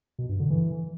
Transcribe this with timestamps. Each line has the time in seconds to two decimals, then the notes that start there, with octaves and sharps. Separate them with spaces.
0.19 B2
0.29 G2
0.40 D3
0.50 E3